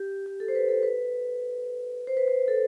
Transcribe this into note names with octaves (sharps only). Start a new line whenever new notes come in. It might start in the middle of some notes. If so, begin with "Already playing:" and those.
Already playing: G4
G4
A4
C5
B4
A4
B4
C5
B4
C5
A4